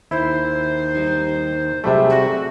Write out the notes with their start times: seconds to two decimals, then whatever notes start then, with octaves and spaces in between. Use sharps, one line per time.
0.11 D#2 E4 C5
0.95 G3 D#4
1.84 C3 F#3 G3 A3 G#4 E5
2.10 F#4